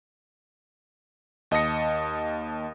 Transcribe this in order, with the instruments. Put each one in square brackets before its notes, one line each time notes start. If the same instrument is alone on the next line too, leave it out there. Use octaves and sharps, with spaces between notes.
[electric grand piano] D#2 D#5 A5 D#6 A#6 C#7